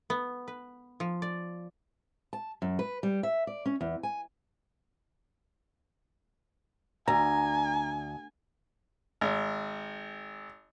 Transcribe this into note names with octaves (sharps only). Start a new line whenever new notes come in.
B3
B4
F3
D5
A5
F#2
B4
G3
E5
D5
C#4
E2
G#5
D2 G#5 A#5
G#1